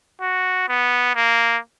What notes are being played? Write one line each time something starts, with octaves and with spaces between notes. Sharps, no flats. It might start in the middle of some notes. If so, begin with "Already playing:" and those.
F#4
B3
A#3